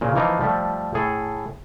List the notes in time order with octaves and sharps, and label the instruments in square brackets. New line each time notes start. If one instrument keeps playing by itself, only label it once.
[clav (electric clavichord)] A#2 C#3 A#3
E3 F3 A#3 D#4 F4
F3 G3 A3
A2 G#4 A4